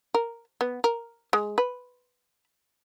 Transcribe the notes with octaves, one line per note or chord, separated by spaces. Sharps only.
A#4
B3
A#4
G#3
B4